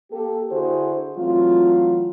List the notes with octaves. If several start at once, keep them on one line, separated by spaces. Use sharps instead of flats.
A#3 G4 A4
D3 E4 F#4 G#4 C5
E3 F#3 A3 C4 F4